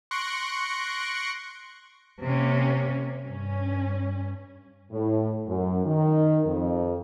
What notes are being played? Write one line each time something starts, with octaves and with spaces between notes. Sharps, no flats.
C6 C#6 F#6 A#6 C#7 D7
C3 A#3 C#4
G2 C#4
A2
F#2
D#3
F2